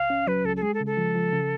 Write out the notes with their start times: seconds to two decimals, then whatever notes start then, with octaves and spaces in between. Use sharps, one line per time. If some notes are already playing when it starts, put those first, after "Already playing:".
Already playing: C#2 F5
0.10 C#4
0.27 F#3 B4
0.45 C#2 A4
0.57 A4
0.62 G#3 G#4
0.74 A4
0.80 C#3
0.86 A4
0.97 F3
1.15 F3
1.33 C#3